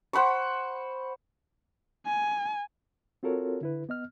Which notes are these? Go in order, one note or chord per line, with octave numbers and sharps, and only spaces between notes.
C5 F#5 B5 C#6
G#5
C4 F4 F#4 A4 A#4 C#5
D3 E4 B4
B3 D#5 F6